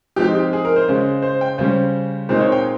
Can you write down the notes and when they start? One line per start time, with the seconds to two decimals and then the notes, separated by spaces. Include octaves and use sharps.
0.16 F3 G#3 C4 D#4 G4
0.35 G4
0.53 G#4
0.65 A#4
0.76 C5
0.88 C#3 G#3 C#4
1.22 C5
1.41 G5
1.58 C#3 G3 C#4 C5
2.29 A#2 G#3 C4 D#4 C5
2.40 C#5
2.52 G5